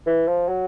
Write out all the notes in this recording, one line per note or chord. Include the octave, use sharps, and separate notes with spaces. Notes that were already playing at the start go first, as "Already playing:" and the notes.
E3
F3
F#3